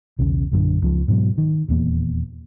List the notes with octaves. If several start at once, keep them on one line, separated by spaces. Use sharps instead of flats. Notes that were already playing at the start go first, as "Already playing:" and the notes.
B1 E2 C#3
A#1 F#2 D3
C#2 F3
G#2 B2 F3 F#3
D#3
D#1 E2 A#3